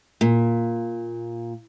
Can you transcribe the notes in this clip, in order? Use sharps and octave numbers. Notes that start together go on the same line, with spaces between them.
A#2